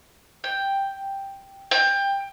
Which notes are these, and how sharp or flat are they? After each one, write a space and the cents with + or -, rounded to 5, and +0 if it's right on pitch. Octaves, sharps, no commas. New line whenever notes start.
G5 +5
G5 +20